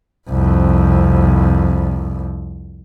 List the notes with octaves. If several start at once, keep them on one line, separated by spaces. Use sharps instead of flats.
C2 F2